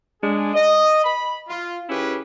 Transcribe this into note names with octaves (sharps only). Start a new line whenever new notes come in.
G#3 D4 G#4
D#5
B5
F4
D#3 C#4 E4 G4 G#4 B4